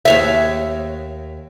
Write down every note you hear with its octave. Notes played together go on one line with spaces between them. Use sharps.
D#2 C#5 E5